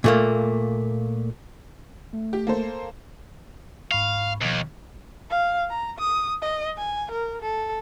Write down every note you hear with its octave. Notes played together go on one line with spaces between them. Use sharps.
A#2 A3 A#3
A3
G4
A#3 A4 C5
G#2 F5 B5 C#6
D#2 B2 F3
F5
A#5
D#6
D#5
G#5
A#4
A4